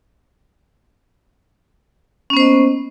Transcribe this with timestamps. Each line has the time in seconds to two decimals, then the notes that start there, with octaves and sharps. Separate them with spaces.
2.30 C#4
2.33 B3
2.37 C5
2.40 D#5
2.43 A#3